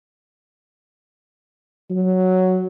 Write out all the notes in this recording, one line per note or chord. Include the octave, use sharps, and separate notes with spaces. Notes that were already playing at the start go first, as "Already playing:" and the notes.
F#3